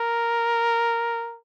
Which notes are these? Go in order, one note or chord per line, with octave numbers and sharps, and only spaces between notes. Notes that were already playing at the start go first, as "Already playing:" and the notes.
Already playing: A#4